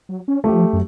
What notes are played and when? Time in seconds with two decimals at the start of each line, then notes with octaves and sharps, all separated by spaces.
0.09 F#3
0.28 C#4
0.44 F3 A3 G4
0.73 F#2